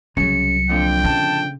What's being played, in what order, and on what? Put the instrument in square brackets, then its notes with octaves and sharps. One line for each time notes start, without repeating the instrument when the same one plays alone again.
[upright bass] C2 F#3 [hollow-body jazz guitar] C#3 [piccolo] C#7
[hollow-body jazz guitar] F2 A#2 D3 [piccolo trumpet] G5
[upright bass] C#3 [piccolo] A5